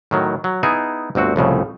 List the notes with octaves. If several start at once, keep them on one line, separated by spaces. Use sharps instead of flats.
A2 D#3 F#3
F#3
B3 D#4 E4 G#4
G1 D2 C4 F#4
C2 F2 A2 C#3